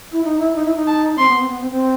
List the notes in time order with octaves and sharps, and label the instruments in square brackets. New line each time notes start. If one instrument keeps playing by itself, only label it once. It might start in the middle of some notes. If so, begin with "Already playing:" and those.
[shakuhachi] E4
D#4
E4
D#4
E4
D#4
[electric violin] A5
[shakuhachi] D#4
[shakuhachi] C4 [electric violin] C6
[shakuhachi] B3
C4
B3
C4
C4